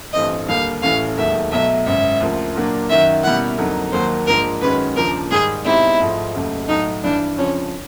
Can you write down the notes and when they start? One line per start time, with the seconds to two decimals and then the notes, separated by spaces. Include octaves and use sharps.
0.13 A1 G2 E3 A3 C4 D#5
0.48 D#2 D3 G3 A#3 F5
0.82 A1 A2 E3 A3 C#4 F5
1.17 E1 D#2 D#3 F#3 A3 E5
1.52 B1 B2 F#3 A3 E5
1.86 G#1 F#2 C#3 E5
2.20 D2 C#3 F3 A#3
2.56 A#2 F#3 A#3 D4
2.90 F#2 D#3 F#3 E5
3.23 B2 G3 A#3 C#4 E4 F#5
3.58 F2 D3 F#3 A#3 D#4
3.92 D#2 D#3 F#3 A#3 C5
4.27 G#2 F3 A#3 D4 A#4
4.61 F#2 D#3 G#3 C#4 F#4 B4
4.96 D#2 C#3 F3 A#3 D4 A#4
5.31 G#2 D#3 G3 G#4
5.65 B2 G#3 C4 D#4 E4 G4
6.00 G#1 G#2 F3 A3
6.34 F1 D#2 C#3 F#3 A3
6.68 B1 A2 F#3 D#4
7.03 G2 E3 G3 D4
7.38 F2 C#3 F3 C#4